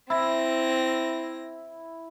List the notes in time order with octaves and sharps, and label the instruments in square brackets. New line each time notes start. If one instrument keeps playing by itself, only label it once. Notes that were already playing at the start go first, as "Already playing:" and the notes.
[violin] C4 A#6 [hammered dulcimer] E4